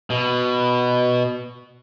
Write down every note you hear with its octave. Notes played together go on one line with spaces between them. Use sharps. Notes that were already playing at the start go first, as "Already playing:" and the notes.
B2